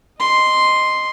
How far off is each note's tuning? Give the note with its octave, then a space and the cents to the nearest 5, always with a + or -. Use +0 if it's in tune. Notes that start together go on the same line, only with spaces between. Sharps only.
D#5 -5 C6 +0